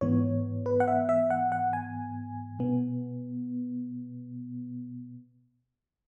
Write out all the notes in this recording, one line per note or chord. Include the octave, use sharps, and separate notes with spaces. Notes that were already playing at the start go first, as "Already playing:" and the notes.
G#2 E3 B3 C#5
B4
F#5
E5
E5
F#5
F#5
G#5
B2 B3